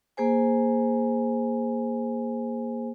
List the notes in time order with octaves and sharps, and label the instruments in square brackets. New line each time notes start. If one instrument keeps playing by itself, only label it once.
[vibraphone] A#3 G#4 C5 G#5